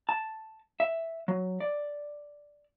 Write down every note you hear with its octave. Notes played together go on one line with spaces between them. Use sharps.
A5
E5
F#3
D5